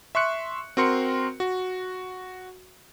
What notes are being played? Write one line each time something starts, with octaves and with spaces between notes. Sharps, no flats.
E5 C6 C#6 F#6 C#7
C4 F#4 A#4 C6 C#7
F#4